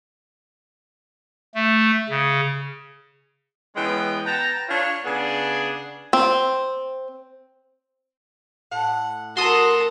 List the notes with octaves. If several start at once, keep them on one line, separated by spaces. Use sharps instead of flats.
A3
C#3
E3 G#3 B3 C#4 G5
B3 G5 A5 A#5
D4 F4 C#5
C#3 B3 D4 G#4
C4
A2 F#5
F#4 A4 A#4 C6 D#6